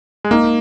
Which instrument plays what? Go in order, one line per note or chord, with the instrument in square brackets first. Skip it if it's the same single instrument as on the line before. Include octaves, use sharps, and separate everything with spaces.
[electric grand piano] G#3
[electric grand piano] A#3 [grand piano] D#4